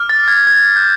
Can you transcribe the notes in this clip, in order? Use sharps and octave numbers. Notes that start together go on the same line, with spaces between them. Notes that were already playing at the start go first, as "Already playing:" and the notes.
Already playing: D6 F6
A6
G#6
G#6
G6